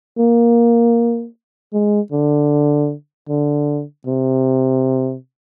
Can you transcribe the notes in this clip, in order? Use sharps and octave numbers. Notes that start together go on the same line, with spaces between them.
A#3
G#3
D3
D3
C3